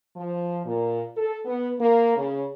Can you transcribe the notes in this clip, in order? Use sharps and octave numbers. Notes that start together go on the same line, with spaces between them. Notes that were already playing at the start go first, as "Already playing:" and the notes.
F3
A#2
A4
B3
A#3
C#3